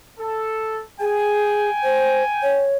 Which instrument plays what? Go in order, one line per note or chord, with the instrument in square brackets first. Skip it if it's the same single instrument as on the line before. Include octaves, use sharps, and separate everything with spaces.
[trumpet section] A4
[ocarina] G#4 [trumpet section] G5 G#5
[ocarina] C5
C#5